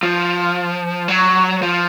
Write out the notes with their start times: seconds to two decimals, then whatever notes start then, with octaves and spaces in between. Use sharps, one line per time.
0.03 F3
1.08 F#3
1.62 F3